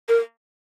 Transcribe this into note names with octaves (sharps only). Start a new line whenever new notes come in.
A#4